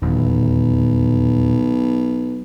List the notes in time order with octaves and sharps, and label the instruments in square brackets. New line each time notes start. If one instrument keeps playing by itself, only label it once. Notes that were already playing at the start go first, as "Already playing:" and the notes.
[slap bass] D#1 E2 [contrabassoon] B1